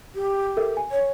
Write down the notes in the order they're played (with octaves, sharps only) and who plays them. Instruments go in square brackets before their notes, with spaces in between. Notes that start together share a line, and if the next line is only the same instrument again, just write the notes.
[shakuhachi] G4
[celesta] A4 A#4 E5
G#5
[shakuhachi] C#5